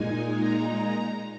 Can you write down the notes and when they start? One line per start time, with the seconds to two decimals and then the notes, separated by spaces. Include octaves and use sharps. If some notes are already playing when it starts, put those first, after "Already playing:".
Already playing: A#2 G#3 D#4 G#5
0.39 A#5